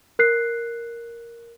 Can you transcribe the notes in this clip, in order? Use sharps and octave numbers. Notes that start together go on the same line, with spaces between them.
A#4 F#6 C7